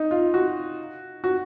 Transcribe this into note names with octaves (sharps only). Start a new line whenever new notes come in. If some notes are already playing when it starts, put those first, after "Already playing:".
Already playing: D#4
F4
F#4
F#4